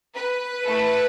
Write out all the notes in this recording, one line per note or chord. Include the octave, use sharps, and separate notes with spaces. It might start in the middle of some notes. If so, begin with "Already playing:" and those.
B4
A3 E4 A4